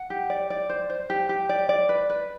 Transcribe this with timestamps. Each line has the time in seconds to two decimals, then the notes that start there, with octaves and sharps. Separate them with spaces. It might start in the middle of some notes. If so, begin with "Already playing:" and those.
Already playing: F#5
0.10 G4
0.30 D5
0.50 D5
0.69 C5
0.90 C5
1.10 G4
1.29 G4
1.49 D5
1.69 D5
1.89 B4
2.10 B4